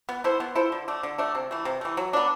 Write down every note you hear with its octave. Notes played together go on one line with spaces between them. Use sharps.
B3
E4 A4 C5
B3
E4 A4 C5
D3
A3 D4
D3
A3 D4
C3
E3 A3
C3
E3 A3
F#3
B3 D4